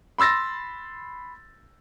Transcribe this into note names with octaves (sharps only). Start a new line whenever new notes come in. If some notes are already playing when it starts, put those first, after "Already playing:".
B5 C6 E6 A6 A#6